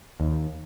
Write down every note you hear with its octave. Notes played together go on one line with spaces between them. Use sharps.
D#2